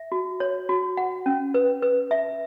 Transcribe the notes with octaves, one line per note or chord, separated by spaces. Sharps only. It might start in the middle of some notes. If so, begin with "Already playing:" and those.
Already playing: E5
F#4
C#5
F#4
F#5
C#4
B4
B4
E5